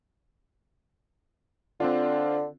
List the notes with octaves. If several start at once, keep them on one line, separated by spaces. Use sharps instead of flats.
D3 C4 D4 F4